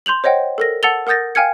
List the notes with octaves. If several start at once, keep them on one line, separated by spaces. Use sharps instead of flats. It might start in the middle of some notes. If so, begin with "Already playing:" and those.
C6 G6 F7 F#7
C5 C#5 D#5 F#5 G5
A4 A#4 A#6
F#5 A5 E6 A6 F7 G7
A#4 F#5 D#6 G6 A6 A#6
F5 G5 G#5 F6 G#6 C#7